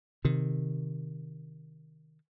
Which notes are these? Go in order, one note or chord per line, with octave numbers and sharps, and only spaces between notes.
C3 D#3